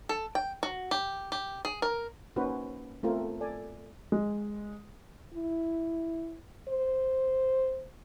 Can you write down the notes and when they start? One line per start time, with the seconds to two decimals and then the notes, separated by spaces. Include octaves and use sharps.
0.09 A4
0.35 G5
0.63 F#4
0.91 G4
1.32 G4
1.65 G#4
1.82 A#4
2.36 A#3 C#4 D#4 F#4 B4 C5
3.03 A3 B3 C4 F4 A#4
3.40 A4 D5 G#5
4.12 G#3
5.34 E4
6.68 C5